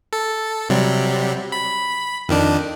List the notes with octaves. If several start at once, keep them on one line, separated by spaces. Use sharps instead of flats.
A4
C3 F#3 G3
B5
F2 D#3 D4